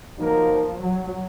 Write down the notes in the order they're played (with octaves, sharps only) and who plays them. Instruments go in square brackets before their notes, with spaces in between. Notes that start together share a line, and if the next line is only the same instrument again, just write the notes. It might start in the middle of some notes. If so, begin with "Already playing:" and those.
[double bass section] F3 [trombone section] F#3 A#3 D#4 A#4
[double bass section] F#3